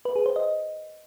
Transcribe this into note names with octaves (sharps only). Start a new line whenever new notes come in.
B4
G#4
C5
D#5